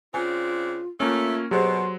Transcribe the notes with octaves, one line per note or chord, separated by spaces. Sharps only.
C#3 C4 D4 F4 G#5
A3 A#3 C#4 F4
B2 F#3 G4 G#4 C5 C6